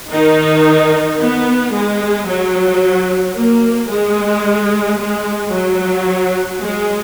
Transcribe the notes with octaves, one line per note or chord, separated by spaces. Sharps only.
D#3 D#4
B3
G#3
F#3
A#3
G#3
G#3
F#3
G#3